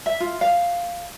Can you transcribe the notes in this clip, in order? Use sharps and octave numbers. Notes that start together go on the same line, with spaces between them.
E5
F4
F5